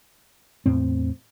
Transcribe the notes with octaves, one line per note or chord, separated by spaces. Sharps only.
E2 A2 C4